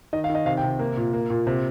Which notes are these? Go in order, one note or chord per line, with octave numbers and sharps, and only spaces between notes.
D#3 D#5
F5
D#3
D#5
C3 F5
G5
C3
A#3
A#2
A#3
A#2
C3